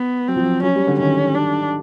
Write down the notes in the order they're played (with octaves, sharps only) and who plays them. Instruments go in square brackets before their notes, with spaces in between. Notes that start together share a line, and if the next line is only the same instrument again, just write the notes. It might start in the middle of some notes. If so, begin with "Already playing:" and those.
Already playing: [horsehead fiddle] B3
[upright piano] F#3 [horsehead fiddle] C4
[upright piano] F3
F#3
[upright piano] F#3 [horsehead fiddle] C#4
[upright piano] G3
D3
[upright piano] D#3 [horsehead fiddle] C#4
[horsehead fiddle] D4